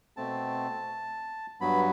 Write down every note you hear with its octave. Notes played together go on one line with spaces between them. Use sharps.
B2 A3 C4 A5
G2 F#3 B3 B5